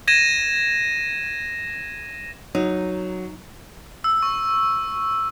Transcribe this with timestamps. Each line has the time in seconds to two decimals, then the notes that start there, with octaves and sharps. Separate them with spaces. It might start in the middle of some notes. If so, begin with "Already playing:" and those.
0.08 G#6 A#6 D#7 E7
2.55 F#3 D#4
4.04 E6
4.22 C#6